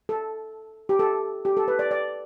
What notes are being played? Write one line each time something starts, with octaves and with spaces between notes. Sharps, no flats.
A4
G4
A4
G4
A4
B4
D5
D5